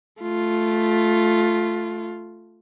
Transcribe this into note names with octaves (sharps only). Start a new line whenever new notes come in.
A3 F4